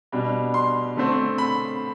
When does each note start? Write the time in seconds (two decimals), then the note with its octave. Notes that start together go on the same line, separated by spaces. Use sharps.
0.12 B2 G3 D4
0.54 C6
0.97 D3 A3 C4
1.38 B5